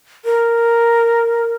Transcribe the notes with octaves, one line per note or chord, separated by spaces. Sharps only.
A#4